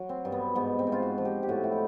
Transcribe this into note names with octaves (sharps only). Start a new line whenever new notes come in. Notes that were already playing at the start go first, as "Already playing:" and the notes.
Already playing: F#3
C4
G2
B3
G#2 B3
C4
G#2
F4
F#4
F3
G4
G4
A2 F#4
E4
D#4